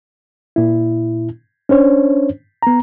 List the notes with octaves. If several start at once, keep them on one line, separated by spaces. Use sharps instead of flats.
A#2 E4
C#4 D4 C5 C#5
B3 A#5